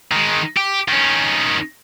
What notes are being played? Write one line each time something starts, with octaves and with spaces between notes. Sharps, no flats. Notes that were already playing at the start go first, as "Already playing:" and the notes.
D#3 G#3
G4
D#3 C#4